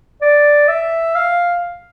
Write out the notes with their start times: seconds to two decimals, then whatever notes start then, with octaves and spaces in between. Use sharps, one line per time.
0.21 D5
0.68 E5
1.15 F5